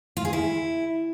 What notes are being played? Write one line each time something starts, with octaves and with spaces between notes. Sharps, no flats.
F4
G#4
E4